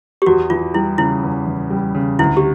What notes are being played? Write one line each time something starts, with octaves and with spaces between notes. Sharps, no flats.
G4
E2 F#4
E3 F4
G3 E4
C#3 E4
E2
E3
G3
C#3
D2 E4
G4